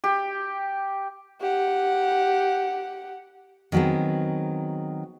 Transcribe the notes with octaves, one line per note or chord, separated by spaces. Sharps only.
G4
G4 F#5
D#3 F#3 B3 C4 G#4